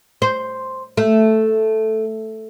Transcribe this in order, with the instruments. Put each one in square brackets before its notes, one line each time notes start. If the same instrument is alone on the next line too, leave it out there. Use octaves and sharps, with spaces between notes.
[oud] C5
A3